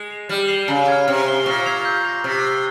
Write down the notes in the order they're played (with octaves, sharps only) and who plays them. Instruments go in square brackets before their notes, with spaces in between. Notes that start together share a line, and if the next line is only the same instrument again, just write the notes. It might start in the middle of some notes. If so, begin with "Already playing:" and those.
Already playing: [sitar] G#3
[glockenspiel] C7 F7
[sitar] G3 [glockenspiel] F6
[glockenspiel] C7 G7
[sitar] C#3 [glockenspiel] A#5
[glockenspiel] F6 G#6
[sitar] C3 [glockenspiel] F6
[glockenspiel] C7 G7
[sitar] A#2 [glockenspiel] C#6
[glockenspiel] G#6 C7 F7
G6
A#6 F7
[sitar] C3 [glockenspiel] F6
[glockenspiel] C7 G7